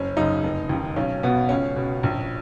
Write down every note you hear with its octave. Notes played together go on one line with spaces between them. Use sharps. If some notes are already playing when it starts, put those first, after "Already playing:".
Already playing: F#1 C#4
F#2 C#3 D#4
F1
D#2 D#3
B1 C#4
B2 B3
C#2 C#4
B2
A#1